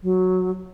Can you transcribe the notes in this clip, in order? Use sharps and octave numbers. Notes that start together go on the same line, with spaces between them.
F#3